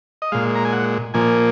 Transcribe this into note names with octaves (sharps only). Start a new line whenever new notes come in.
D#5
A#2 G#3 F5
A#5
G#5
F#5
A#2 F3 A#3 G#5